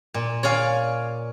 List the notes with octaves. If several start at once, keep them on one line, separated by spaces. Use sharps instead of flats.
A#2
C#5 D5 F5 G#5